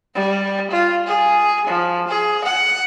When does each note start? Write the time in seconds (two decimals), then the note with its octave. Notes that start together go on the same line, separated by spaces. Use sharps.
0.14 G3
0.71 F4
1.07 G#4
1.67 F3
2.08 G#4
2.44 F#5